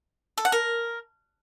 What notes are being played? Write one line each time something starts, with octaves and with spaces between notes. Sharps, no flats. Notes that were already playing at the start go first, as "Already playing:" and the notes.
A4
F#5
A#4